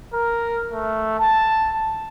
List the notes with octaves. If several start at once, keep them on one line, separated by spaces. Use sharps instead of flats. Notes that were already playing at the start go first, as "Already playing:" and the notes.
A#4
A3
A5